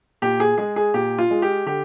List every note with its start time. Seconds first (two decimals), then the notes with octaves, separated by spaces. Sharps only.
0.22 A#2 G4
0.40 G#4
0.58 G#3 G#4
0.76 G#4
0.94 A#2 G4
1.18 F4
1.31 G#3
1.42 G4
1.66 D3 G4